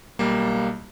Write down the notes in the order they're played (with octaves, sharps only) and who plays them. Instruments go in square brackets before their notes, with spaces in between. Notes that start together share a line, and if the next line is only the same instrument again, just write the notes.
[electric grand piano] B1 G3 A#3